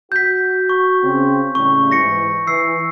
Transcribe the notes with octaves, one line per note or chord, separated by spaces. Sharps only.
F#4 G6 B6
C#6
C#3 C4
A2 C#3 G3 C#6
G#2 E3 A#6 C#7
E3 E6 C7